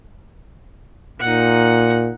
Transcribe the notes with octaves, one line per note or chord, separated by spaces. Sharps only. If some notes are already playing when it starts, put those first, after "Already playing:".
A#2 D#4 F#5